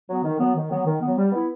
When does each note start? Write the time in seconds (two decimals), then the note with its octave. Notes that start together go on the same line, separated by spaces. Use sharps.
0.08 F#3 B3
0.24 D#3
0.39 F#3 B3
0.55 D#3
0.70 F#3 B3
0.85 D#3
1.01 F#3 B3
1.17 G3
1.32 B3 E4